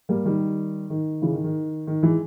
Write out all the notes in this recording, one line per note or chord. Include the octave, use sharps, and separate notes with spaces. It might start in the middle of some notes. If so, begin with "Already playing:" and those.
G3 A#3
D#3 G3
D#3
C#3 E3
D#3
D#3
D#3
E3 G#3